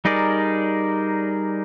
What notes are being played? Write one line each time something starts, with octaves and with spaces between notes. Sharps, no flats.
G3 D#4 G#4 A#4 D5